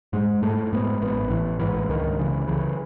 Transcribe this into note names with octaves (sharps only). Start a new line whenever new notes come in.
G#2 G#3
G#2 A3
G#2 B3
A1 B3
A1 E3
G#2 E3
C#2 D#3
C#3 E3
C#3 E3